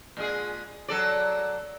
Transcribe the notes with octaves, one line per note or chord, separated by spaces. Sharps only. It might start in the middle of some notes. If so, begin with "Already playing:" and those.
A#2 G#3 G#4
F#3 A4 D5